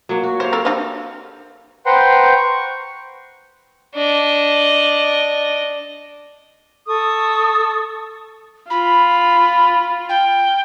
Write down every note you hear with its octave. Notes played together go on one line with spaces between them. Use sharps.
F#3 A#3
F#4
G4 C5 C#5 F5
C4 A4 A#4
F3 D4
B4 C5 F#5 G5 A#5 C6
C#6
D4 D#5
A4 C#6 D#6
F4 B5
G5